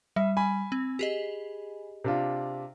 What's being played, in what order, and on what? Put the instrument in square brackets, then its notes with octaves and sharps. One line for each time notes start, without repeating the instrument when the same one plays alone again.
[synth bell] G3 [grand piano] E5
[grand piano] G#5 B5
[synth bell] C4
G4 G#4 D#5
[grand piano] C3 D4 F4